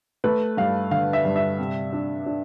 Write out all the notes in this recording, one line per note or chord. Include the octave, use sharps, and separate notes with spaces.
A3 B4
G2 F5
D3 F5
E5
G2
E5
C3
D4
D4